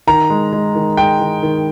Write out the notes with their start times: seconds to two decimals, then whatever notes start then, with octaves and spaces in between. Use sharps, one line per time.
0.07 D#3 A#5
0.30 G#3
0.53 G#3
0.75 D#3
0.97 G#3 G5
1.20 D#3
1.43 D#3